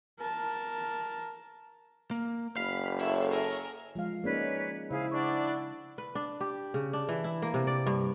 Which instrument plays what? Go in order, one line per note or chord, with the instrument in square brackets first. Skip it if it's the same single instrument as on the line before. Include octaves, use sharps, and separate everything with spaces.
[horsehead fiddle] A#4 A5
[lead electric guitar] A#3
[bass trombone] F#1 [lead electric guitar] F5 [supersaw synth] B5 B6 [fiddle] F6
[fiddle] E4 [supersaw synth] A4 C#5 E5
[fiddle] G#4 A#4
[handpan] F3 G#3 F5
[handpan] A#3 C#4 D#4 [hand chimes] G#4 A#4 D5 [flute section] B4 C#5
[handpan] C#3 [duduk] E4 [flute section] G#4 F5 [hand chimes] C5
[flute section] D4 D5 [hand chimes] F#5 C#6
[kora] B4
D4
G4
C#3
D4
E3
E4
A#3
C3
D5
G2